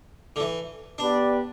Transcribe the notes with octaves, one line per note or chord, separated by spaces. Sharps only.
D3
E3
B3 D4 G4 B4 D5